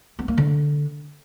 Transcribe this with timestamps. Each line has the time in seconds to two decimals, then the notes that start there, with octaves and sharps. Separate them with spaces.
0.19 B3
0.28 A#3
0.38 D3